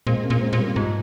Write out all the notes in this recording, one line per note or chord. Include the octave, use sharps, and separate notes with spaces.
A#2 G#3 C4
A#3 C#4
A#2
G#3 C4
A#2
G3 A#3
G#2 F3 G#3